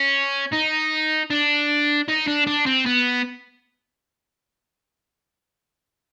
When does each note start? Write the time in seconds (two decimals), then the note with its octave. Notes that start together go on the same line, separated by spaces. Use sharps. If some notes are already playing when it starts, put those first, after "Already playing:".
Already playing: C#4
0.53 D#4
1.30 D4
2.08 D#4
2.28 D4
2.47 D4
2.66 C4
2.86 B3